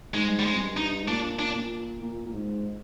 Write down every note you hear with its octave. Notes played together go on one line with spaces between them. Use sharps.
G#2 G#3
G3
G#3
F2
G2
D#4
G#2
A#2 D4
D4
A#2
A#2
A#2
G#2